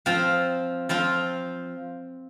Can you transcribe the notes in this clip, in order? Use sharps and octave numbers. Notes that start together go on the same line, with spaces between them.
F3 C4 F4
F3 C4 F4